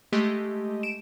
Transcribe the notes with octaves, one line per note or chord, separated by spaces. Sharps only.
G#3 A3 G4 D#5
D7 E7